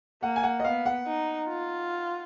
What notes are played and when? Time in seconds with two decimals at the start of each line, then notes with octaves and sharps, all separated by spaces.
0.22 A#3 F#5
0.36 G#5
0.43 F#5
0.60 D#5
0.64 B3 F5
0.86 F#5
1.07 D#4
1.49 F4